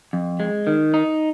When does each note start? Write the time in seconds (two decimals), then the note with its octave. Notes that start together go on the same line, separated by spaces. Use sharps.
0.13 F2
0.40 G#3
0.67 D#3
0.94 D#4